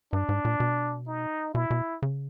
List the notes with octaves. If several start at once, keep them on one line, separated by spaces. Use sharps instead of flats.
G2 D4
G#2
A#2
B2
D#4
B2 E4
B2
C#3